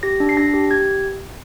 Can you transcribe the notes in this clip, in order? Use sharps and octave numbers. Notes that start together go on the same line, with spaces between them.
G4 A#6
D4
C7
D4 A#6
G4
G4 G#6